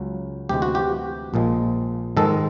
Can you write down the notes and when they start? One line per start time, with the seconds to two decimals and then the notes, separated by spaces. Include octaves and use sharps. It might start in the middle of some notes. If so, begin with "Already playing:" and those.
Already playing: C#2 C#3 F#3
0.49 D2 C3 E3 G#3 G4
0.62 F#4
0.75 G4
1.34 A#1 A#2 F3 G#3
2.17 G#2 D#3 G#3 A4